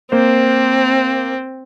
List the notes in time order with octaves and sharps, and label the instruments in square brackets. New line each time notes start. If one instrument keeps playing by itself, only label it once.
[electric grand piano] A#3 C5 [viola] C4